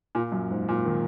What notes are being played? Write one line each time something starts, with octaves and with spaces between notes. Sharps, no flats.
A#2
F#2
G#2
A#2
D#3